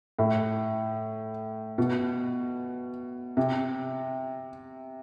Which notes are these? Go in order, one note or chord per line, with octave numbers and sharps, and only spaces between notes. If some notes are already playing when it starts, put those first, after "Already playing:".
A2
B2
C3